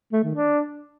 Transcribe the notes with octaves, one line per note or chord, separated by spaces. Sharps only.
A3
D#3
D4